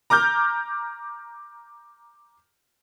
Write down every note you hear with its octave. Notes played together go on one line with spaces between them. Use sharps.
A#5 D6 F6 G6